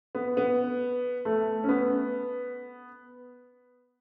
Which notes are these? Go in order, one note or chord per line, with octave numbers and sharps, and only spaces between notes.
B3
B3
A3
C#4
B3